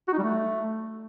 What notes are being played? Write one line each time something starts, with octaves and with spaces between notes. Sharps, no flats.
F#4
D#4
G3
A3